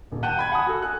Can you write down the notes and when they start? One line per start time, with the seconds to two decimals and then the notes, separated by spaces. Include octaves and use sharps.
0.12 D#1
0.23 F#5 G5 A5 F#6 G6 D#7
0.37 F#5 B5 G#6
0.52 F#5 G#5 A5 B5 D#6
0.67 F#4 A4
0.82 G#5 F#6